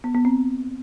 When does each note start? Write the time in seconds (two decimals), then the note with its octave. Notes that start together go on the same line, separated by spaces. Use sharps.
0.04 B3
0.14 B3
0.25 C4